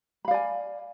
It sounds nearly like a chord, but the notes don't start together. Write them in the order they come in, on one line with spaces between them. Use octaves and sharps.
B5 F5 D5 G#5